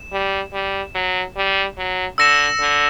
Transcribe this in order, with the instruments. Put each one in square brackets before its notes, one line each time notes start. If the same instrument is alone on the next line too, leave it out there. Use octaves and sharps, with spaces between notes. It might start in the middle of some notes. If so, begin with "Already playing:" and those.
Already playing: [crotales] E7
[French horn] G3
G3
F#3
G3
F#3
[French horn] D3 [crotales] E6 A#6 C#7 E7
[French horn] D3